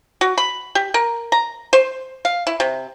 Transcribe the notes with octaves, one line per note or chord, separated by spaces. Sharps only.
F#4
B5
G4
A#4
A#5
C5
F5
E4
C3